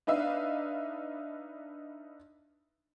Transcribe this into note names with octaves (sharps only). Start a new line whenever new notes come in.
D4 D#4 B4 E5 F5